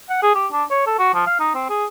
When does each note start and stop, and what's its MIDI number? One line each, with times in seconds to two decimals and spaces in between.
0.09 0.19 78
0.22 0.33 68
0.35 0.47 67
0.52 0.63 62
0.70 0.83 73
0.87 0.96 69
0.99 1.10 66
1.14 1.24 53
1.26 1.36 77
1.39 1.52 63
1.55 1.65 60
1.69 1.86 68